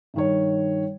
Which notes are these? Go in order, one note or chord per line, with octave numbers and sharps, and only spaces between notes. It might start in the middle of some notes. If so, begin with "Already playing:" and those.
G2 D#3 C#5